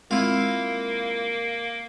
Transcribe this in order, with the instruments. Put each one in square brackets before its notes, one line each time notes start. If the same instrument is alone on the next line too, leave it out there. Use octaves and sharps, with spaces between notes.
[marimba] G#3 C4 [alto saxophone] A#3 [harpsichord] E4 F4